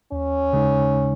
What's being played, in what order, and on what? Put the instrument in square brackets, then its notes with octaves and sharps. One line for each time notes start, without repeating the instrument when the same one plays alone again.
[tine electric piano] D#2 [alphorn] C#4
[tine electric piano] C#3 G#3 D#4